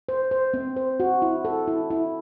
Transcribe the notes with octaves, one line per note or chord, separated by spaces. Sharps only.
C5
C5
C4
C5
F#4
E4
A4
E4
E4